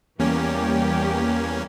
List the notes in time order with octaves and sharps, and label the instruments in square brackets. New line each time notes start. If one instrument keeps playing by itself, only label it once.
[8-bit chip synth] E2 C#4 [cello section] E3 G3 G4 [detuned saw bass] A#3